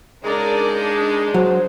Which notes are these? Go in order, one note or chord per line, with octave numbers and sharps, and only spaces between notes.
C#3 G#3 D4 D#4 A#4 D5
D4
F#3 C5